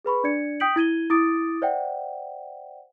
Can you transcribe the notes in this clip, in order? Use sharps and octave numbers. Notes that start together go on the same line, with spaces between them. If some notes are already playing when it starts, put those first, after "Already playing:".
G#4 B4 B5 C#6
D4 D5 G#6 C#7
G5 D#6 G6 B6 D7 F#7
E4 G#6 D#7 G7
E4 D6 D#6 A6 D7
C5 D5 E5 F#5 G5